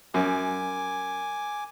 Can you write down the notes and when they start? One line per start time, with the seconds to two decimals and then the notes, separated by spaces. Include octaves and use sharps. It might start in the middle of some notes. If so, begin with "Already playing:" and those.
0.14 F#2 G#5 D6